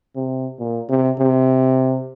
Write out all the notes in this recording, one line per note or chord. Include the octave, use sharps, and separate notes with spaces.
C3
A#2
C3
C3